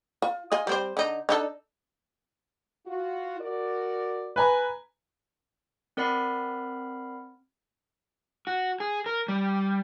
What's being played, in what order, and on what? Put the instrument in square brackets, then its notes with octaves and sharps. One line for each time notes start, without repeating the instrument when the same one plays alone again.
[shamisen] F4
F4 D#5 G#5
G3 C4 C5
D3 D#4
D4 D#4 A4
[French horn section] F4 F#4
F#4 A#4 D5
[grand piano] B4 G#5 A#5
[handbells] C4 A#4 D5 F#5 B5 C7
[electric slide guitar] F#4
G#4
A#4
G3